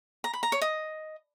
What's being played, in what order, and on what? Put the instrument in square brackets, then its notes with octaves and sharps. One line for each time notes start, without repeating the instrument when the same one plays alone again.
[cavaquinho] A#5
B5
A#5
C#5
D#5